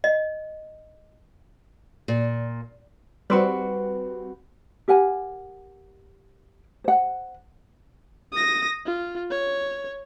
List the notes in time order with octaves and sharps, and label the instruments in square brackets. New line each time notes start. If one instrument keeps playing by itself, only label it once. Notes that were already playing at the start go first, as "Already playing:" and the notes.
[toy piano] D#5
[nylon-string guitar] A#2
[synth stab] G3 C4 [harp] F#4 B4
[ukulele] G4 A#4 F#5 G#5
C5 F#5
[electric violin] D#6 A#6
F4
C#5